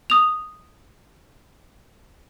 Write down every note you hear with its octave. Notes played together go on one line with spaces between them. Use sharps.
D#6 F7